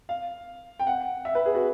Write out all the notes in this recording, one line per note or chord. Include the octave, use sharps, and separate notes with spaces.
F5
G5
F#5
E5
B4
G#4
F#4